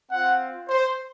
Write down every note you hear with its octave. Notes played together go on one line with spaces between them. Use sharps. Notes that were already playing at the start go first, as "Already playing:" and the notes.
C4 F4 F#5
C5